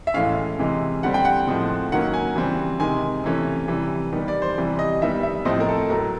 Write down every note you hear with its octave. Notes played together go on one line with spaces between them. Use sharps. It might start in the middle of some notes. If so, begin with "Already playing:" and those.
E5
A2 E3 G#3 C#4 F5
C3 E3 G#3
D3 G3 C4 F#5
G5
F#5
A2 F3 G#3 C4
D#3 F#3 A#3 C#4 F#5
G#5
C#3 E3 G3 C4
C3 D#3 G#3 G#5
C3 E3 A3 C#4
C3 E3 G3
D#3 G3 B3
D5
C5
C3 E3 G3
D#5
D#3 G3 B3 E5
E5
A2 F3 A3 C4 D#5
A#4
A4
A2 F#3 A3 A#4